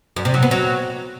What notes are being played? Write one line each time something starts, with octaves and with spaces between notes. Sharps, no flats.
F#2
C3
F#3
B3
F#3